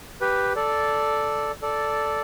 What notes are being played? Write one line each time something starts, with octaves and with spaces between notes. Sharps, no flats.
G4 B4
A4 D5
A4 D5